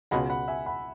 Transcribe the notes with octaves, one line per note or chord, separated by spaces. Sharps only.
C#2 B2 G#3 F#5 B5
F#5 B5
E5 G#5
F#5 B5